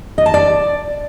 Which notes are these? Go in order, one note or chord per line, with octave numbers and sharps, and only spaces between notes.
D#5
A5
D5